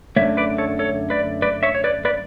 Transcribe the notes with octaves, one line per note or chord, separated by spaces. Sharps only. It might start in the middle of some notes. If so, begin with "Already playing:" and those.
F#2 D3 A3 C#5 E5
B4 D5
A4 C#5
A4 C#5
B4 D5
B4 D5
C#5 E5
C#5
B4 D5
B4 D5